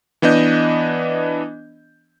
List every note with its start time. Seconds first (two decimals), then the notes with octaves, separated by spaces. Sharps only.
0.22 E3 B3 D4 D#5 G6